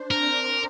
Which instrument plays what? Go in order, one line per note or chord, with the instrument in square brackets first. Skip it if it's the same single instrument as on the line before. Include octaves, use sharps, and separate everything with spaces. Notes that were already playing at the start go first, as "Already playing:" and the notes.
Already playing: [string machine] D4 C5
[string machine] C4 [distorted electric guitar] A#4